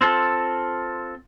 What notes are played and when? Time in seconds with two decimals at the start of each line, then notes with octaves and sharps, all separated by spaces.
0.01 C4 F4 A4